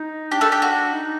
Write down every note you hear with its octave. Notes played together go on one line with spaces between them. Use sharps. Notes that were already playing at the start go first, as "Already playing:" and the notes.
Already playing: D#4
D4 G4
A3 A4
G4
F#4
D#4